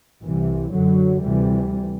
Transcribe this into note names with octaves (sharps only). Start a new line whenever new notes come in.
C2 C3 E3
F#2 D3 F#3
D2 C3 E3 G3